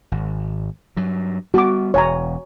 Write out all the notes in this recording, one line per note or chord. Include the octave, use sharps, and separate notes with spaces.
G#1
G2 F#3
G3 B3 F#4 D6
E1 C#5 G#5 A#5